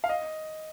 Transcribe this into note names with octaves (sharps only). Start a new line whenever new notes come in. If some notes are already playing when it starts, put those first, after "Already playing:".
F5
D#5